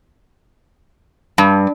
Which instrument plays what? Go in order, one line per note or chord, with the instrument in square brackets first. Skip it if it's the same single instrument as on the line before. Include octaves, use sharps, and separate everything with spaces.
[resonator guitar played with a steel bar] G2